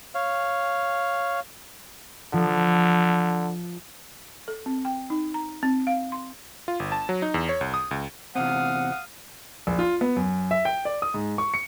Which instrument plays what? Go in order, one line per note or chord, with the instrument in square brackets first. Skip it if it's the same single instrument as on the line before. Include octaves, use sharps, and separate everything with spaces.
[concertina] C#5 F5
[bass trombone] D3 [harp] F3
[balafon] A4
C4
G5
D#4
A#5
C4
F5
C6
[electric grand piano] F4
G1
A5
F#3
D#4
E2
C#5
C2
D#6
C#2
[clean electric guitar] E2 C3 C4 [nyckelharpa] F5 D#6 [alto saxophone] F#5
[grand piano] A#1
F4
B3
F#2
E5
G5
D5
D#6
G#2
C#6
C#7